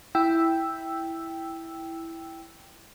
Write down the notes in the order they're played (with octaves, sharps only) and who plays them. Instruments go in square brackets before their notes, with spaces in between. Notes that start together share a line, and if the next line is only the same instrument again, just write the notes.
[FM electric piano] E4 G5 E6